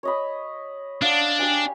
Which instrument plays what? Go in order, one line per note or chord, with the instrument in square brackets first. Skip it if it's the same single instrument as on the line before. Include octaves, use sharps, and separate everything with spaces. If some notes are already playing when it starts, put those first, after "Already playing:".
[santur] C#5 D#5 B5
[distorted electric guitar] D4 [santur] F5 F#5
[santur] G4 F5 G#5